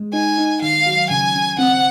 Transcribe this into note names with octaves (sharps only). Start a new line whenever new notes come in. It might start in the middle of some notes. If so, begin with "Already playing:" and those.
Already playing: G#3
D#4 G#5
D#4
D#3 F5
F#3
C#3 G#5
C#3
C4 F#5